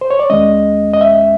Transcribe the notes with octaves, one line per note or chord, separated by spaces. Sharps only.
C5
C#5
D5
D#2 D#3 G#3 C#4 D#5
D#5
E5